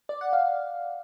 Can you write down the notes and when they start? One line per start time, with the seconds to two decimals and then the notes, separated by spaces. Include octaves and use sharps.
0.09 D5
0.21 F#5
0.33 F5